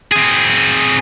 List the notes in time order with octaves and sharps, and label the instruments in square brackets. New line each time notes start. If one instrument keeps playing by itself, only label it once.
[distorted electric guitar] C4 G#4